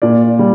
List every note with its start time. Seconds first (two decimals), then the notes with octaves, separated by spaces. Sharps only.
0.02 A#2 D5
0.39 G3